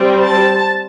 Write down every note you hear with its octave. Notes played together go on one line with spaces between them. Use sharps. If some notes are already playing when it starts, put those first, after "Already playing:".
Already playing: G3 C4
A5